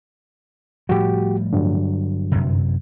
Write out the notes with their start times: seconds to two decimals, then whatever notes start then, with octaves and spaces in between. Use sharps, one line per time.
0.89 A2 F3 G3 F#4 G4
1.53 G2 D3 F#3
2.32 F#2 C3